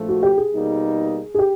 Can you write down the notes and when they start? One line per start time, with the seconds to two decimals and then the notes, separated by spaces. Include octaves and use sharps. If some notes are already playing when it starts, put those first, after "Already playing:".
Already playing: A#1 A2 F3 A3
0.09 F#4
0.23 G4
0.37 G#4
0.51 B2 G3 A#3 D#4
1.34 G#4
1.39 G4